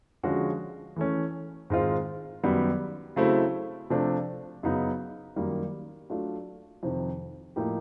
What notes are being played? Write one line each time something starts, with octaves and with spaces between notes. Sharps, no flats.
D3 F3 G#3 C#4 F#4
E3 A3 C#4
G#2 D#3 G#3 C4 F4
F#2 D#3 G3 B3
C#3 F#3 A3 C4 E4
C3 F3 A3 D4
F#2 C#3 F#3 B3 D#4
F#2 D#3 G3 A#3
F#3 A3 D4 F4
F2 C3 D#3
A2 F3 A#3 D#4 G4